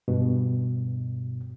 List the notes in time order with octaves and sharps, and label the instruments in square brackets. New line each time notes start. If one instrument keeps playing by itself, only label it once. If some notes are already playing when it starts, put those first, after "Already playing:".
[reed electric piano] G2 B2